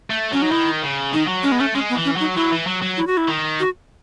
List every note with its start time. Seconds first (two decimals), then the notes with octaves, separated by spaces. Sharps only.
0.10 A3
0.31 F#3 C#4
0.42 D#4
0.51 D#3 E4
0.83 C#3
1.13 D#3 D#4
1.28 F#3
1.43 G#3 C#4
1.52 B3
1.60 A3 C#4
1.74 G#3 C#4
1.90 B3
1.95 E3
2.05 C#4
2.16 F#3 D#4
2.36 F#3 E4
2.52 E3
2.67 F#3
2.82 F#3
2.97 E4
3.07 F#4
3.17 E4
3.28 D#3
3.60 F#4